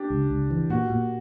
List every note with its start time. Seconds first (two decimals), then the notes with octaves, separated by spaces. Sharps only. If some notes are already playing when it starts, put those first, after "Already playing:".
Already playing: D4 G4
0.10 C#2
0.30 C#2
0.50 E3
0.70 A#2 F#4
0.90 A#2